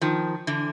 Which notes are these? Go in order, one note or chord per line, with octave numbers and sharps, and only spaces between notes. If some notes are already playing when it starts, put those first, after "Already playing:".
D#3 F3
D3 E3